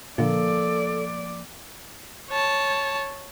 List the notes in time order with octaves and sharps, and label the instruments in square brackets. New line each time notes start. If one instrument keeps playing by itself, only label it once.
[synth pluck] A#2 D3 [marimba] F3 A#3 A#4 [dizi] A4 [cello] D5
[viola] C#5 A5